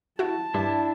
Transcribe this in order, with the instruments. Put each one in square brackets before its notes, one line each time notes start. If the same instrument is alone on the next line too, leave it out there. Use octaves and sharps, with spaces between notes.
[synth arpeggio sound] E4 F#4 [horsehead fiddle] A5
[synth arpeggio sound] G2 [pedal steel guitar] D4 E4